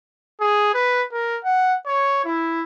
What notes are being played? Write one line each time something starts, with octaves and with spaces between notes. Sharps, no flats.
G#4
B4
A#4
F#5
C#5
E4